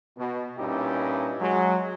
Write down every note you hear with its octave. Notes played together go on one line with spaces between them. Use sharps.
B2
G2 A#2 C#4 D#4 E4 G4
F#3 G#3